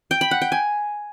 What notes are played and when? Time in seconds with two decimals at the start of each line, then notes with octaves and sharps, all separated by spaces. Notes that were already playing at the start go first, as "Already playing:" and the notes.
0.11 G5
0.21 B5
0.31 F#5
0.41 G5
0.52 G#5